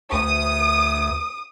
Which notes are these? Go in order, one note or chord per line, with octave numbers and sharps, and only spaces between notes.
D2 D#6